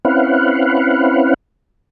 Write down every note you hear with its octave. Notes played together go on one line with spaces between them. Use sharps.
C4 C#4 E4 B4 F5 F#5